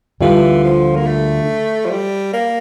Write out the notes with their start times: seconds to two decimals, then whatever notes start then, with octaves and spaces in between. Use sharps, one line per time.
0.21 D2 D3 E3 G3 D4 F4
0.64 F3
0.96 A#3
1.06 A3
1.85 F3
1.91 G3
2.33 A#3